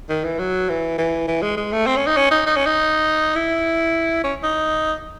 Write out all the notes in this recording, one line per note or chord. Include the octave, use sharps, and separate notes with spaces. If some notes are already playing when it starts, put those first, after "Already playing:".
D#3
E3
F#3
E3
E3
E3
G#3
G#3
A3
C4
C#4
D#4
C#4
D#4
D#4
C#4
D#4
E4
C#4
D#4